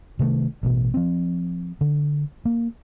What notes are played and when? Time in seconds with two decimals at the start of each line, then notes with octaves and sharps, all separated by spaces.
0.19 C3 D#3 A3
0.63 A1 B2
0.94 F3 C4
1.81 D3
2.45 A#3